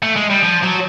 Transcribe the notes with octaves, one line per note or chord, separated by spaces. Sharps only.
A3
G#3
G3
F3
F#3